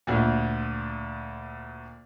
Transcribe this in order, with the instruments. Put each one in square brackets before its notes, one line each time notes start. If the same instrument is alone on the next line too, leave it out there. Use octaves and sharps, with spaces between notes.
[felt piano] D2 A#2